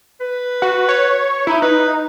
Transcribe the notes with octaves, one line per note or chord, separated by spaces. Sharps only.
B4
F#4
C#5
D#4 E4
D#4 B4